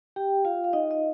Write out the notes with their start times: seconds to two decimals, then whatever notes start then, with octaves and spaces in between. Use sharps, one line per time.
0.16 G4 G5
0.45 F4 F5
0.64 F5
0.73 D#4 D#5
0.91 D#5